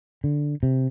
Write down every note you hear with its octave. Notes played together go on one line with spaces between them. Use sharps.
D3
C3